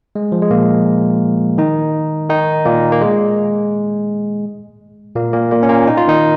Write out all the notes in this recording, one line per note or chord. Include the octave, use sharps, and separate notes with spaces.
G#3
F3
G#3
A#2 A#3
D#3 D#4
D#3 D#4
A#2 A#3
A#3
G#3
A#2 A#3
A#2 A#3
A#2 A#3
C#4
A#2 A#3
D#4
F4
D#3 D#4